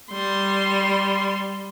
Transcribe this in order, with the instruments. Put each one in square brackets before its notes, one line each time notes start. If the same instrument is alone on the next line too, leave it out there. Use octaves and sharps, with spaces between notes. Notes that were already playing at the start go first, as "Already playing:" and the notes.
[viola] G3 C6